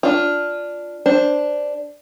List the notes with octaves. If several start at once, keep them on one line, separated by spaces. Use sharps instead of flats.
D4 F4
D4 C5